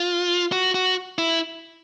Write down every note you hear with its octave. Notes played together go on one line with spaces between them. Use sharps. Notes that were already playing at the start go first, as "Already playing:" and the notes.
Already playing: F4
F#4
F#4
E4